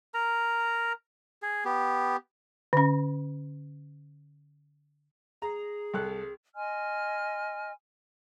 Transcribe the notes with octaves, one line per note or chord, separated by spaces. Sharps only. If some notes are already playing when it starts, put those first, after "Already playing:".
A#4 A#5
G#4
B3 G4
D3 C#4
G#4 A#5
C2 A4 F#6
D#5 G#5 C6 F6